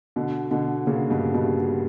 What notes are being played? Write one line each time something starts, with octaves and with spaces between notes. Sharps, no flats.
B2 D3
B2 D3
A#2 C#3
G2 B2
G2 B2